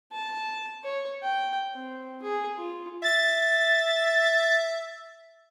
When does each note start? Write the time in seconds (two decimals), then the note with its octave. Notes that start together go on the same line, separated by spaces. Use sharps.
0.12 A5
0.84 C#5
1.22 G5
1.76 C4
2.22 G#4
2.58 F4
3.03 E5 A6